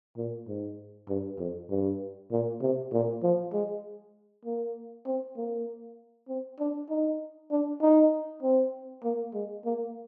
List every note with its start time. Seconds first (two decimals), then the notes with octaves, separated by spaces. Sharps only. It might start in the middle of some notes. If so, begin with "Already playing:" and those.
0.17 A#2
0.48 G#2
1.09 G2
1.39 F2
1.70 G2
2.31 A#2
2.62 C3
2.92 A#2
3.23 F3
3.53 G#3
4.45 A#3
5.06 C4
5.37 A#3
6.28 C4
6.59 D4
6.90 D#4
7.51 D4
7.82 D#4
8.43 C4
9.04 A#3
9.34 G#3
9.65 A#3